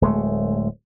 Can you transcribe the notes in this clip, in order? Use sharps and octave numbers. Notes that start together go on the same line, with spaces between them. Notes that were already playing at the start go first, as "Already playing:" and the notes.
D1 G#3 A3